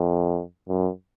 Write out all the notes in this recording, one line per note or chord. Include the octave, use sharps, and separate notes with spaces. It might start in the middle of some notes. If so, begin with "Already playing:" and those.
Already playing: F2
F#2